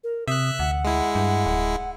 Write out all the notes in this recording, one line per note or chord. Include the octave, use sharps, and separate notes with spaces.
A#4
C3 E5 D#6 F#6
D2 F#5
G#3 E4
G2
D1